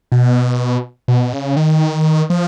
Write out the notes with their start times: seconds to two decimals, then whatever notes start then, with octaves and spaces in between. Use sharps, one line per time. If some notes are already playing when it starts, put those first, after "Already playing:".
0.12 B2
1.08 B2
1.33 C#3
1.57 D#3
2.30 F3